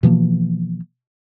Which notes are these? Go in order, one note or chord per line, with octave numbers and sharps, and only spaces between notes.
B2 E3 F3 A#3